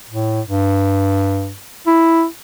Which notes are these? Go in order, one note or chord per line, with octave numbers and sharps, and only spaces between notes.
A2
G2
E4